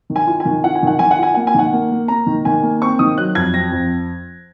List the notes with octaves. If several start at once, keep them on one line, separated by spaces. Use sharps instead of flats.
D#3
G#5
F4
G#5
D#3
F4 F#5
G#5
D#3 F#5
D#3 G#5
F#5
F4 G#5
A#3 F#5
G#5
D#3 F#5
A#3
A#3
A#3 A#5
D#3
D#3 G#5
A#3
C4 C#6
D#3 D#6
F#3 F#6
F2 G#6
C4 A#6
F2